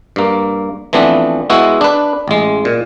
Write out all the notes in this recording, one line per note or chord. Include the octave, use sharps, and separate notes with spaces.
G2 A#3
E3 F3 A3 B3 C4 D4
G#3 B3 E4 F#4
D4 B4
A1 G#3
A#2